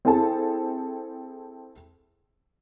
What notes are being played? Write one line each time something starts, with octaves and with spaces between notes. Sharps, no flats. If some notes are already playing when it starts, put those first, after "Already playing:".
C4 E4 G#4 A4 A5